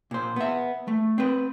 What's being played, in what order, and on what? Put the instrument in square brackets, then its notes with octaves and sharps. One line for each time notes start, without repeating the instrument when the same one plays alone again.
[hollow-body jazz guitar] A#2 C5
B3 E5
A3
C4 B4